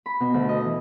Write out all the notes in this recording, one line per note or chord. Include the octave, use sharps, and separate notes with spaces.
B5
B2
D2
D#5
E3